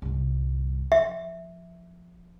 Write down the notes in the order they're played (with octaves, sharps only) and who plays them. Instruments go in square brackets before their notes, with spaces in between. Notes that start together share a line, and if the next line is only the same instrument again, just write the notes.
[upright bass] G1 C2
[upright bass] F3 [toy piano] E5